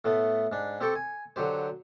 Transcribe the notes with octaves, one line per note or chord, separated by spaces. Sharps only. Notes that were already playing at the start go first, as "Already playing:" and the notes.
A2 A3 B3
G#2 D4
C4 G4 A4 G5 C#6
G#5
D3 F#3 G4 C5